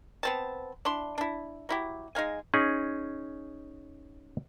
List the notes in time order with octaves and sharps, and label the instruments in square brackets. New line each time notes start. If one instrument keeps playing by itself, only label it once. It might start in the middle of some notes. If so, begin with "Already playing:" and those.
[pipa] B3 C4 A5
D4 E4 C6
D4 E4
F#3 E4 G4
G#3 D#4 F5 G#5
[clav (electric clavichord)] C#4 D#4 G#4